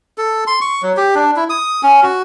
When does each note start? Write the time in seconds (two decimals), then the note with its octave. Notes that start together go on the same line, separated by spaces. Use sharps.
0.18 A4
0.47 C6
0.61 C#6
0.83 F#3
0.97 G4
1.15 D4
1.36 E4
1.50 D#6
1.83 C#4
2.03 F#4